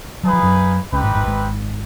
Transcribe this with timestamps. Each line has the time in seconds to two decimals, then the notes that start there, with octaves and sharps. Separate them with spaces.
0.23 F#3 A#3 D#4 G#4 B4
0.33 F3
0.43 F#2 F#3
0.92 C#2 C#3 C4 D#4 G4 B4
1.04 G#1 G#2
1.15 G#1 G#2
1.26 G#1 G#2